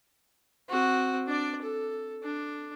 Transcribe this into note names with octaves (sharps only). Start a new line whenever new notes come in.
C4 F#4
D4 D5
A4
D4